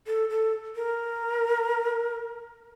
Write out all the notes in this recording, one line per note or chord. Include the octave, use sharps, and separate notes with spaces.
A4
A4
A#4